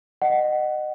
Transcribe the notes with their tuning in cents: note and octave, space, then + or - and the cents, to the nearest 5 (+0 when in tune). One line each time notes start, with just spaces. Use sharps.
D#5 -25 F#5 +15